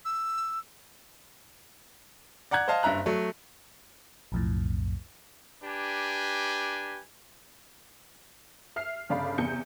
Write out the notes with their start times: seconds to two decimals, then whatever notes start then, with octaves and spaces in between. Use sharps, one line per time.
0.05 E6
2.51 D5 F#5 A#5 F#6 G#6
2.68 C5 D#5 F5 A5
2.83 F#1 G2 E5 A#5 F#6
3.06 F#3 A3
4.32 B1 F2 A2
5.63 D4 G4 B4 G#5
8.76 E5 F6 C7
9.09 G1 C#3 D5 F5 B5
9.38 E2 C3 G6 C#7